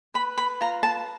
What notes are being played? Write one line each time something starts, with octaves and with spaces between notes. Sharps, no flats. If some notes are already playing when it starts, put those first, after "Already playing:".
B4 B5
B5
F4 A#5
A5